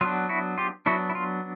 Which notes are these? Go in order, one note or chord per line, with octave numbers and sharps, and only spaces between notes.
F#3 B3 D4 F4
E4 F#4
F4 G4
F#3 B3 D4 E4 F#4
E4
F4